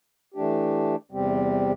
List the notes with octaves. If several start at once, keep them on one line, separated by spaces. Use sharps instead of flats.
E3 A3 D4 G4
E2 C3 G3 C4 G4